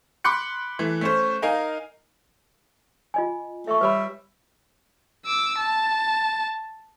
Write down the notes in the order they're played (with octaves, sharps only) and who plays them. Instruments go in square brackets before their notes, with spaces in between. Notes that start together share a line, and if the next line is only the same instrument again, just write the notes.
[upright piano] B5 C6 D6 F#6 C#7
E3 A3
A3 C#4 C5
D#4 A#4 F5 G#5
[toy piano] F4 D#5 G#5
[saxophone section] A3 [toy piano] E5 C#6
[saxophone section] G3 E5 [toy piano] B4 C#5 B5
[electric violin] D6 E6
A5